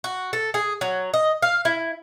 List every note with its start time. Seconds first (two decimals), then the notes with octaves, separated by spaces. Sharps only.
0.04 F#4
0.33 A4
0.54 G#4
0.81 F#3
1.14 D#5
1.42 F5
1.65 E4